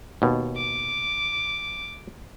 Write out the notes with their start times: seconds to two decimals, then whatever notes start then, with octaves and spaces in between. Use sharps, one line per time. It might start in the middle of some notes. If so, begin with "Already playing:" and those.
0.22 D#2 B2
0.56 D6